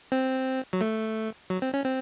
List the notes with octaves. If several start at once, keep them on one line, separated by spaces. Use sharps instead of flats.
C4
F#3
A3
F#3
C4
C#4
C4